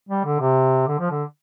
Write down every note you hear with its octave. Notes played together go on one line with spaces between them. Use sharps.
G3
D3
C3
D3
F3
D3